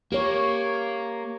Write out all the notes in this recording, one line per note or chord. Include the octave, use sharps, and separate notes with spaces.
A#3 G4 A#4 C#5